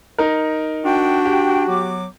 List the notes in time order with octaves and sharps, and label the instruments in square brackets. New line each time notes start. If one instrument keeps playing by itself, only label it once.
[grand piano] D#4 A#4
[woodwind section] D4 G5 [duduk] F#4
[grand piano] G4
[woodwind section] F#3 B3 D6